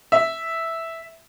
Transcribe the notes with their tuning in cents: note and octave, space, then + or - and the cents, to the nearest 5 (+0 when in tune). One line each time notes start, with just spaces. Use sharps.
E5 -5